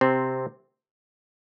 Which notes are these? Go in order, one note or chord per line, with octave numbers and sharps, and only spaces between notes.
C3 C4